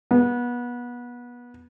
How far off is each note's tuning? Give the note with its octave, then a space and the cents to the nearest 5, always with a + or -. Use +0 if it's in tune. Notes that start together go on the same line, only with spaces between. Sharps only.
B3 -25